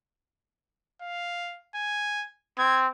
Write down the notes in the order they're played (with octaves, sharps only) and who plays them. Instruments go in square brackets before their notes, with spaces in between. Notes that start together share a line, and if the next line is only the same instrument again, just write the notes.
[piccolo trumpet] F5
G#5
[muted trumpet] C4 [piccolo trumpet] G#6